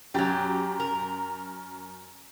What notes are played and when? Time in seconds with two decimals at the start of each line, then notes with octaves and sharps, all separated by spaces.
0.14 F#2 F#3 G4 G5 A6
0.80 A#4